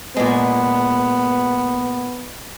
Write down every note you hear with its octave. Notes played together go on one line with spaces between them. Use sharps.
A#2 G#3 B3